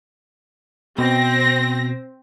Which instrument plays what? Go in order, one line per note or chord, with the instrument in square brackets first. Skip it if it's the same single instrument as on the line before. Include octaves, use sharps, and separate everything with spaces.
[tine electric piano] B2 [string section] C4 A#6